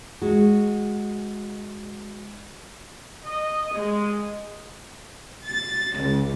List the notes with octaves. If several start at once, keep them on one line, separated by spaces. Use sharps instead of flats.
G#3 F#4
D#5
G#3
A6
C#2